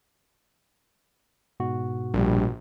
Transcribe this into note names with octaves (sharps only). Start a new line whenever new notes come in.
G#2 B2 F#4
A#1 G3